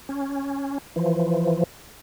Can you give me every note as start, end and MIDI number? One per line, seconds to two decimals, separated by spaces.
0.09 0.78 61
0.96 1.64 52
0.96 1.64 53